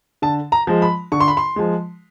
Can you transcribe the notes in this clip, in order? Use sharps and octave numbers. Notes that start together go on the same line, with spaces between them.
D3 A5
A#5
F3 G#3
B5
D3 C#6
C6
B5
C6
F3 G#3